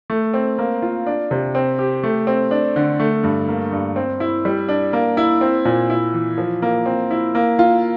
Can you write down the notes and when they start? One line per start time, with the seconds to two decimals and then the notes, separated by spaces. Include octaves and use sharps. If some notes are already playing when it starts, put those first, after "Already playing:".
0.10 A3
0.34 C4
0.58 A#3
0.82 F4
1.06 D4
1.31 C3
1.55 C4
1.78 G4
2.03 A3
2.27 C4
2.51 D4
2.76 D3
3.00 A3
3.24 G2
3.48 A#3
3.72 G2
3.96 C4
4.20 E4
4.45 G3
4.69 D4
4.93 A#3
5.17 E4
5.41 C4
5.65 A#2
5.90 E4
6.14 E3
6.38 F3
6.62 A#3
6.86 C4
7.11 E4
7.35 A#3
7.59 F4